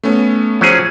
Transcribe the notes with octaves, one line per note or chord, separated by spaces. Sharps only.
A3 B3 C#4
F3 F#3 C#4 G#4